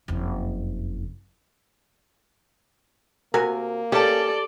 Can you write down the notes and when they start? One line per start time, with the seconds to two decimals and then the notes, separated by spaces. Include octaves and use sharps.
0.08 F#1 F2
3.34 C3 A#3 F#4 A#4 G#5
3.92 C#4 G4 A4 D5 A5